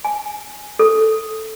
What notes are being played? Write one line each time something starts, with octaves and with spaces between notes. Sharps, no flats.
G#5
A4